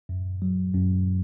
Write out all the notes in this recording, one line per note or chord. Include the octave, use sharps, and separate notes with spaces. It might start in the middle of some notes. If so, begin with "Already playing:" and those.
F#2
F#3
F#2